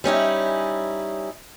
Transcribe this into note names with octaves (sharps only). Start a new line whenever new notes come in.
G3 C#4 D#4 E4